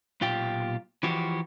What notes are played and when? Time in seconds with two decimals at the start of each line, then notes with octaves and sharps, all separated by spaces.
0.21 B1 A#2 F4 G4 G5
1.03 E3 F3 F#4 G4